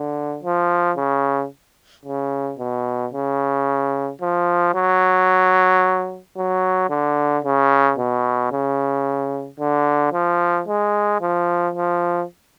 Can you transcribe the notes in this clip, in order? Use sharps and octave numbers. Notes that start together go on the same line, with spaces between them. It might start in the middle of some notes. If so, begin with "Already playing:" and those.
Already playing: D3
F3
C#3
C#3
B2
C#3
F3
F#3
F#3
D3
C#3
B2
C#3
D3
F3
G#3
F3
F3